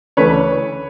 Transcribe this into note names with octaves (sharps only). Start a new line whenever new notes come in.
D2 C#3 E3 A3 B4 C#5